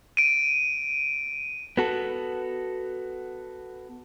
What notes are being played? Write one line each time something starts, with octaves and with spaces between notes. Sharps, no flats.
D7 D#7
B3 F#4 A4